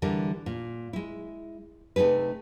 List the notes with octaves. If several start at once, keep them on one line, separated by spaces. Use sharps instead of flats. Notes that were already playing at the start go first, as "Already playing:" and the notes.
D3 E3 G3 A#4
A#2
G#3 E4
C3 A3 D#4 G#4 B4